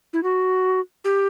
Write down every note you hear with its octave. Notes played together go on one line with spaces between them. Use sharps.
E4
F#4
G4